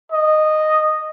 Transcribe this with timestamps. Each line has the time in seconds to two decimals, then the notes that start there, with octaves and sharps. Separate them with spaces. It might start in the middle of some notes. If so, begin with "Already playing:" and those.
0.12 D#5